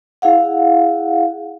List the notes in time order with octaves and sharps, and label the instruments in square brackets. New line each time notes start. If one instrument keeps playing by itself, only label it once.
[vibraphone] E4 G#4 F5 F#5